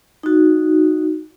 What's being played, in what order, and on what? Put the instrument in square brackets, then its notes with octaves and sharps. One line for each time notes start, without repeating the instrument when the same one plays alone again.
[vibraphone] D#4 F#4